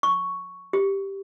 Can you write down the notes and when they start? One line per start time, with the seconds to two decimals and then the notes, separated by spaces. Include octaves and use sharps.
0.03 C#6
0.73 G4